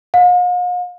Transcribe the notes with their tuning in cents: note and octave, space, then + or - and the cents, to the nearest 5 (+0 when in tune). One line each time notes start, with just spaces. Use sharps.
F5 +45